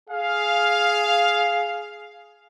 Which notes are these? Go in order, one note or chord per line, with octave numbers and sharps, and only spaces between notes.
G#4 F5